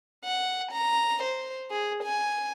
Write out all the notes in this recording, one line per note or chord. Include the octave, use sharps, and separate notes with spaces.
F#5
A#5
C5
G#4
G#5